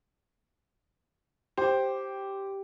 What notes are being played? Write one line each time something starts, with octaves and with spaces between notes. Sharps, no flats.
G4 C5